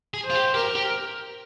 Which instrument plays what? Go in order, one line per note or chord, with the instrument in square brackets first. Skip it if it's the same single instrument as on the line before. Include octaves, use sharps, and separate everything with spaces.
[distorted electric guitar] G#4
[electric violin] C5
[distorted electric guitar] F4
G4
[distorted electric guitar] G4 [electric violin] A#4
[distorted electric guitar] G4